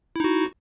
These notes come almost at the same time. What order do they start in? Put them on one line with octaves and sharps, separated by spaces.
E4 D#4 F#4